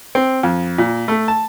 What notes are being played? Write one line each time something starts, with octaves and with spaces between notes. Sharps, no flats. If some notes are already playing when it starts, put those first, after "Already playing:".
C4
F2
A#2
A3
A5